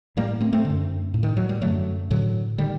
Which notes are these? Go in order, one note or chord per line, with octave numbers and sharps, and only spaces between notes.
A2 G3 A#3
A3 C4
A3 C4
F#2 D3
A2
D#3
F#3
G3
F#2 D3 F#3 A3
A2 D3 F#3
D3 D#3 G3